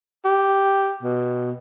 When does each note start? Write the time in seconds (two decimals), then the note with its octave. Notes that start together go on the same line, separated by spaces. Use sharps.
0.25 G4
1.03 B2